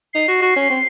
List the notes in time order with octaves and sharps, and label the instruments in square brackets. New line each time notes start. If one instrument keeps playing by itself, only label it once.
[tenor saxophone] D#4 [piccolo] C7
[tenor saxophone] F#4
F#4
C#4
C4